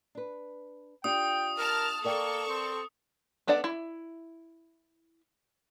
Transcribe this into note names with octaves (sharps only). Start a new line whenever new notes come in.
D4 B4
D4 F4 G4 G5 D#6
A#4 A5 F6
A#3 A4 A#4 D5 G5 C#6
C4
B3 D4 A4 D5 F#5
E4